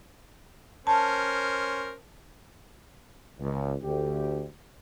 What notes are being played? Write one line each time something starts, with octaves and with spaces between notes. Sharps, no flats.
C#4 A#4 C5 A5
C#2
D2 G4